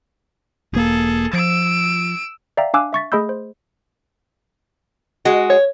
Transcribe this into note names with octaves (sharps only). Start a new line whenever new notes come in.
E1 A#3 G#4 A4
F3 E6 D7
D5 E5 F5 G5 A#5
D4 F5 G#5 D6 E6 F#6
E5 C#6 A6 B6
A3 G#4 D#5 B5 E6 G6
C5
G#3 F#4
C#5